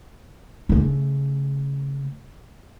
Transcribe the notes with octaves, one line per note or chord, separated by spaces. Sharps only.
C#3 A3